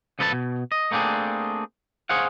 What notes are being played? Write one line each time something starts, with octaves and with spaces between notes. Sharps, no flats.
C#2 F3 A4 B4 C#5 A5
B2
D#5
A3 A#3 C4 D4 G#4
G#4 C5 C#5 F5 F#5